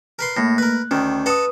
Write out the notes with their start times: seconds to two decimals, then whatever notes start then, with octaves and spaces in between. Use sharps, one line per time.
0.19 A#4 B4 C6
0.37 A2 A3 A#3 A#6
0.58 A#4 B4 F#6
0.91 D2 D#3 C#4
1.26 A4 B4 D#5 F#5 D#6